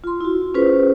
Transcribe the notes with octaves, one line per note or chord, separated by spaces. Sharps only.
F4 C6
E4 F#4
C#4 F4 G#4 B4 C5